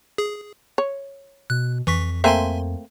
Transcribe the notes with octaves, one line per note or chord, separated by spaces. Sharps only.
G#4
C#5
B2 F#6
F2 E3 C#6 B6
A3 A#3 C4 E5 G#5 C6